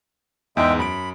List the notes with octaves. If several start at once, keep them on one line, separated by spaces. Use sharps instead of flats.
E2 G#2 G#3 E5 G5
F#2 B5 D7